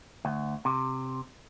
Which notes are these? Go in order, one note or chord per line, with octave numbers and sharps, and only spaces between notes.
D2
C3